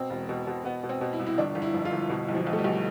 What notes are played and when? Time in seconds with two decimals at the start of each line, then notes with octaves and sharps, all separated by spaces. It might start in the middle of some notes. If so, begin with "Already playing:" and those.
Already playing: B2 C4
0.10 E1
0.29 B2
0.47 B2
0.65 B2 B3
0.83 B2
0.89 C4
1.01 B2
1.13 E4
1.19 C2
1.27 E4
1.38 G1 D4
1.55 G1
1.62 E4
1.74 F2
1.85 F4
1.93 G1
2.10 B2 E4
2.28 B1
2.34 F3
2.47 B1
2.53 A3
2.59 G3
2.64 B1